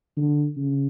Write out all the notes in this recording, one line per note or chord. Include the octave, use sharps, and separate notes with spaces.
D3
C#3